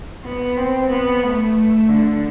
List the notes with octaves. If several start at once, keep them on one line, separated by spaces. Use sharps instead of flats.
B3
C4
B3
A3
D3